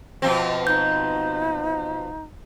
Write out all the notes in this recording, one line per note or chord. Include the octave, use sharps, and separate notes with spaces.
B2 F3 C4
D#4 G6